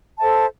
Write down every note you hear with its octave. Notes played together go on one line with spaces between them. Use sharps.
A4 C5 E5 A5